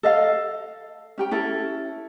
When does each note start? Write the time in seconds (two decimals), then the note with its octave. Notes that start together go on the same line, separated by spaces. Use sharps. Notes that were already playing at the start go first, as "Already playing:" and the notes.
0.03 A4 D#5 F5
1.18 C#4 G4 G5
1.31 C#4 E4 A4